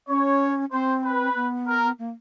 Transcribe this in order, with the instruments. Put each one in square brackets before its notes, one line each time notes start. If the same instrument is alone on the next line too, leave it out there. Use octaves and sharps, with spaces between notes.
[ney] C#4 [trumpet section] C#5
[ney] C4 [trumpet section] C5
[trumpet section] B4
[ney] B3
[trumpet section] A#4
[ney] A#3